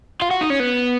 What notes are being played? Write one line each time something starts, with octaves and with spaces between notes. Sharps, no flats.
F4
F#4
D#4
C#4
B3